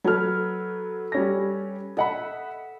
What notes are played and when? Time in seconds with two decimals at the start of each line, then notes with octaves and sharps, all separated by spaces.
0.04 F#3 A4 B4 F6
1.12 G3 C#4 A#6
1.97 D#5 E5 F#5 B5